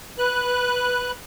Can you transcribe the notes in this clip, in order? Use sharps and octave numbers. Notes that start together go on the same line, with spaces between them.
B4 F#6